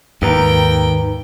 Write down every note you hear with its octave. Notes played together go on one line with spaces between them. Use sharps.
D#2 G#2 D#3 B4 G5 A#5